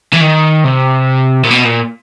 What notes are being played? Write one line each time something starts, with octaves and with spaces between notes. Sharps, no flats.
E3
D#3
C3
A#2
B2
A#2